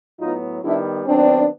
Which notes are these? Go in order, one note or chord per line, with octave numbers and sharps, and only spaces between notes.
A2 F#3 B3 D#4 F4
D#3 G3 B3 D4 E4
D#3 F#3 B3 C4 D4